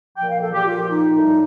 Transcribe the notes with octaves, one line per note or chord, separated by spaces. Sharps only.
A#2 F3 G5
F5
A4
G4
A#2 F3 F4
D#4
A2 G3